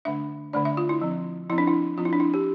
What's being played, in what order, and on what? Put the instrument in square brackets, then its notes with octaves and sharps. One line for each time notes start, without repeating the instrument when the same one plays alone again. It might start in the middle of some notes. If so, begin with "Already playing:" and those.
[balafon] D3 A3 D4 E5
D3 A3 D4 D5
E5
F4
E4
F3 C4
F3 C4 E4
D4
E4
F3 C4 F4
E4
D4
E4
G4